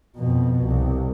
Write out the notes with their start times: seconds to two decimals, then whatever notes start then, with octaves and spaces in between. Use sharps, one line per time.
0.17 F2 B2
0.64 C2